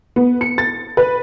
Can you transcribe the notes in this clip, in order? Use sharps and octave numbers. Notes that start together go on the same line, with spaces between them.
B3
C#7
A6
B4